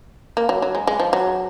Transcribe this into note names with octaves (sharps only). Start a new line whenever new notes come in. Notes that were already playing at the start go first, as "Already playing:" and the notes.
A#3
F#3
F#3
G#3
G#3
F3
F#3